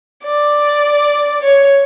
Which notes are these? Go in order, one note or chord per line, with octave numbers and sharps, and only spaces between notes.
D5
C#5